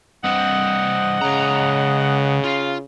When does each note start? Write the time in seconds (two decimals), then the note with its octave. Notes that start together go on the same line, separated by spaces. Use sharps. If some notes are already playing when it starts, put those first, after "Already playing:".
0.24 G2 C4 D#5 F#5
1.22 C#2 C#3 A#5
2.44 F4